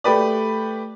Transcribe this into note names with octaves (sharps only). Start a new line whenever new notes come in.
A3 G4 B4 D5